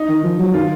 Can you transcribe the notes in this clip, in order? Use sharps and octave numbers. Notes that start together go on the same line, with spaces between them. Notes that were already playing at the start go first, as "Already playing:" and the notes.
Already playing: D#4
D#3
F3
F#3
D#3 F4